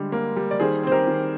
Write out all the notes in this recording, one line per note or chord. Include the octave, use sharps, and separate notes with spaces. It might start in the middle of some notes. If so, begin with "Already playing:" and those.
Already playing: D3 G3 G#3
A#3
G3
D5
D#3 G#4 C5
C4 C5
G4 A#4
D#3